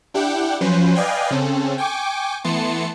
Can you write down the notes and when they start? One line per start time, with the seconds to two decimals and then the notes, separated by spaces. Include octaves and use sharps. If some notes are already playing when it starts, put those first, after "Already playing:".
0.14 D4 E4 G4 F#5 G5
0.61 F3 F#3 C#4 B4 C5
0.96 B4 D5 D#5 F5 G5 G#5
1.31 C#3 C4 C#4 A4
1.78 G5 G#5 C#6 D6
2.44 E3 A3 B3 A5 C6 C#7